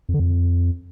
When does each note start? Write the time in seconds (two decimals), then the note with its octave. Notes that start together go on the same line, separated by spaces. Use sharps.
0.09 F2
0.14 D3
0.20 F2